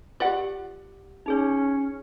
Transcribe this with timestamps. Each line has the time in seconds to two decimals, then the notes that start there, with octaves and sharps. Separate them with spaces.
0.20 F4 G4 D5 F#5
1.26 C#4 D#4 G#4 C#5